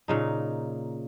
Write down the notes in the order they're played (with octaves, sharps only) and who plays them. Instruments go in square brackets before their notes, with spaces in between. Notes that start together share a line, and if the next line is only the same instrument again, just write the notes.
[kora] A#2 C#3 D#4